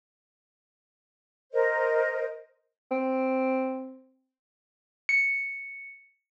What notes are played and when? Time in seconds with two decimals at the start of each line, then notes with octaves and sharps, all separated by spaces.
1.52 A#4 C5 D#5
2.91 C4
5.09 C#7